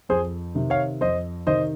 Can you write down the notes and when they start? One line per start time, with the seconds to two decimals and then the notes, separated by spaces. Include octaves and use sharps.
0.09 F2 G#4 C5
0.55 C3 D#3
0.70 C#5 F5
1.01 F2 C5 D#5
1.47 C3 D#3 C5 D#5